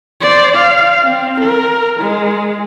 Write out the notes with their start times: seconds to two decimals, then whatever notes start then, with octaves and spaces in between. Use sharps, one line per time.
0.22 C5 D5
0.56 F5
1.03 C4
1.41 A#4
2.01 G#3